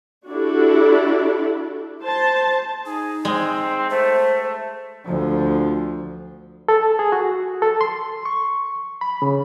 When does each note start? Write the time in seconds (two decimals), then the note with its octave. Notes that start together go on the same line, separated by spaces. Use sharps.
0.29 D4 E4 F#4 G4 A4 D5
2.04 C5 A5
2.86 D#4 G#4
3.25 G#3 C4
3.90 A3 C5
5.05 D2 F3
6.68 A4
6.99 G#4
7.12 F#4
7.62 A4
7.81 C6
8.25 C#6
9.01 B5
9.22 C#3